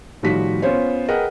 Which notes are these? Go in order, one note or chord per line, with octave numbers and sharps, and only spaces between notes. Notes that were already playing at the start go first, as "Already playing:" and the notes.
A2 D#3 F3 G3 F#4 B6
B3 C#4 F4 C5 C#5
G#4 A#4 B4 D#5 F#5 G5